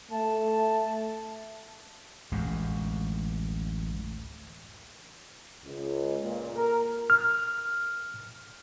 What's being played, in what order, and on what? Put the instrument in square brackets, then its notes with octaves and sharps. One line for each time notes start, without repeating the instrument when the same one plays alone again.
[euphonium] A3 [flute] A5
[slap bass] D1 A1 F#2 G#3
[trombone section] C#2
A#2
A#4
[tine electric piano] F6